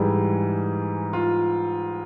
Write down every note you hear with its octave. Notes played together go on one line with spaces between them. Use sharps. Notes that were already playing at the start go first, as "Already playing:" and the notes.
Already playing: G#2 E3 G3 G#4
F4